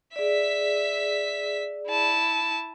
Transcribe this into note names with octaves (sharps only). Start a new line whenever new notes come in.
G#4 D5 E5 B6
E4 A5